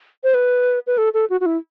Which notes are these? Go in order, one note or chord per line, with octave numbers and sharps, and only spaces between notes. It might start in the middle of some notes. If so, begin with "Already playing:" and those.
C5
B4
B4
A4
A4
F#4
F#4
E4